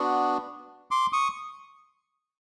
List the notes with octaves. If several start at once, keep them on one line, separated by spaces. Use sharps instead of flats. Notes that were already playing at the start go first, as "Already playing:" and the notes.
Already playing: B3 D4 F#4
C6 D6
C#6 D#6